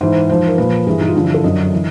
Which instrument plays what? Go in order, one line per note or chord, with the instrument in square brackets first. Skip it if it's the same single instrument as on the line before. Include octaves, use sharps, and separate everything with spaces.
[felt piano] G#2 E3 C5
G#2 F3 C5
A#4
A#2 F3 B4
G2 E3 G#4
D#4
F4
G2 D3 F3 E4
E4
A4
F#2 D3 F#3 D#5
E3